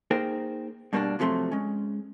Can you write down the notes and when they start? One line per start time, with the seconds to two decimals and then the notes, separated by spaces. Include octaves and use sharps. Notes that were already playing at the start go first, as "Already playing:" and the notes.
0.11 A#3 D#4 G#4 A#4 C5 G5
0.93 G2 B2 G3 A#3 C4 D4
1.19 C3 F3 F#3 A3 C4 C6
1.52 G#3 C#4